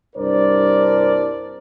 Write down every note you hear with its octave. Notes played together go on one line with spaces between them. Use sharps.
C2 G2 D4 A#4 C5 D5